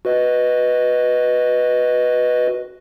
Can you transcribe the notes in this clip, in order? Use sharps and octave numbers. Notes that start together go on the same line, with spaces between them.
F#4 B4 D#5